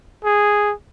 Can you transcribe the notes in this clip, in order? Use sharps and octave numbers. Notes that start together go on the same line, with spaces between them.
G#4